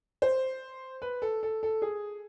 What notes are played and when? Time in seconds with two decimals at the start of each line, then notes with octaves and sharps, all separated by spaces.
0.22 C5
1.02 B4
1.22 A4
1.43 A4
1.63 A4
1.82 G#4